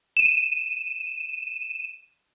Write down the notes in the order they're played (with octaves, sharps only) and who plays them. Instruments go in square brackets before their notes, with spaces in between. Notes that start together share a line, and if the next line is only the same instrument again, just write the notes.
[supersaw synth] D#7 E7